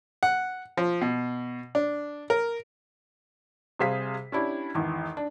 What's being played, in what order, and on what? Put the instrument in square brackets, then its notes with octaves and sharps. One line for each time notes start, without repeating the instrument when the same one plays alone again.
[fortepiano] F#5
F3
B2
D4
A#4
[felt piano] C3 G3 G#4 C5 F5 B6
C#4 D4 E4 G4
G#1 E2
D4